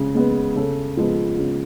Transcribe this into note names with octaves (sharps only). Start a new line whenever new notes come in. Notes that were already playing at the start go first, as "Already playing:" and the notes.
Already playing: C#3 G#3
G#3 B3
C#3 A4
F3 G#3 B3
C#3